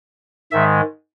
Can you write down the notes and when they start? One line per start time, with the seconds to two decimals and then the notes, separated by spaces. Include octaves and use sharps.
0.52 G#2 D#3 G#3 E5